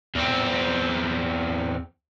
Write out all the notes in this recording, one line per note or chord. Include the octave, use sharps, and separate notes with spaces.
E2 C4